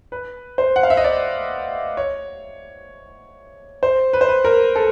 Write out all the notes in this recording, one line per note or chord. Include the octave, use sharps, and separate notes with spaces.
B4
C5
F#5
F5
E5
D#5
D5
C#5
C5
B4
C5
B4
A#4
A4